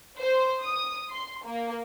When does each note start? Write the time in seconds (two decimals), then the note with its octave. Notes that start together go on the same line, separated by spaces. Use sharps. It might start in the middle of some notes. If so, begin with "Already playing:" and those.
0.19 C5
0.63 D#6
1.11 C6
1.46 A#3